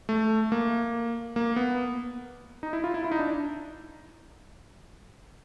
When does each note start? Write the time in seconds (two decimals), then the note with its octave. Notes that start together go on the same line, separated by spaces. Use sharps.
0.09 A3
0.52 A#3
1.36 A#3
1.56 B3
2.63 D#4
2.73 E4
2.84 F4
2.94 E4
3.04 E4
3.12 D#4
3.19 D4